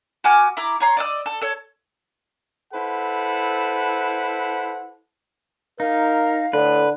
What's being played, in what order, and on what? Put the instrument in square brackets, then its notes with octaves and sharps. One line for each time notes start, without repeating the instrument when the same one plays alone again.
[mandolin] F#4 G#5 D6 F6
E4 A#5 D6
C#5 A#5 C6
D5 D#5 E6
A4
A4 C#5
[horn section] E4 A4 B4 C5 F#5
[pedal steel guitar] D#4 [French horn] A#4 [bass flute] F5
[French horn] A2 [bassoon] D3 [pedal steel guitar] B4